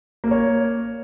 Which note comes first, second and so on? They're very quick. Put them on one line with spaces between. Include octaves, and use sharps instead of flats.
A#3 A#4 C#5